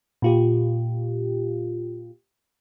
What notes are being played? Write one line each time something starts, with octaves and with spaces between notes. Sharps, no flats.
A#2 F4 G4